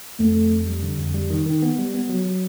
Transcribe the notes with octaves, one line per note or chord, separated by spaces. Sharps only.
F2 A3
F2
F2
G3
D3
F2
G3
D#3
D#3
B3
G3
B3
F#3
F#3